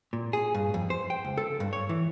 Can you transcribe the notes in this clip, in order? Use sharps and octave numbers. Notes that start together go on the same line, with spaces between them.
A#2
G#4
G2
F2
C5
G5
C#2
A4
G2
C#5
E3